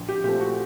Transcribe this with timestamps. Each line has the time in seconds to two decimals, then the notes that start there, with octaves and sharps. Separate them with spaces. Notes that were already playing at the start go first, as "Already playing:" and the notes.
Already playing: A#1
0.09 G4
0.24 A#2 F3 A3 C4 G4
0.40 F#4